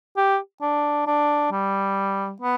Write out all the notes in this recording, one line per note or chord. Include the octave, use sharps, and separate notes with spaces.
G4
D4
D4
G3
B3